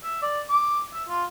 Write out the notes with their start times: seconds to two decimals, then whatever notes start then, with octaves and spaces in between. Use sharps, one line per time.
0.04 E5
0.22 D5
0.49 D6
0.94 E5
1.09 F4